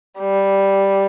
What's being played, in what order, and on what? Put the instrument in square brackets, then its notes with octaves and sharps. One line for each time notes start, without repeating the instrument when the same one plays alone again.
[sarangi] G3